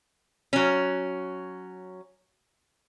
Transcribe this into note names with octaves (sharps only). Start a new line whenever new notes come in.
F#3 C#4